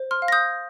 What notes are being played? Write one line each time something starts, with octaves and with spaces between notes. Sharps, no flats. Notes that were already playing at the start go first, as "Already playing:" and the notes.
Already playing: C5
C6 F6
F5
A#6
D#6 G6